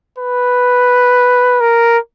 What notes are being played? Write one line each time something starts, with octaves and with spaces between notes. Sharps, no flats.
B4
A#4